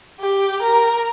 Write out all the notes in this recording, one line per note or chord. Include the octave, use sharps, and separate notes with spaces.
G4
A#4